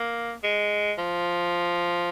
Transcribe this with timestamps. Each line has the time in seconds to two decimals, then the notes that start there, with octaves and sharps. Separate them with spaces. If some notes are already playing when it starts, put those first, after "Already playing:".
Already playing: A#3
0.43 G#3
0.98 F3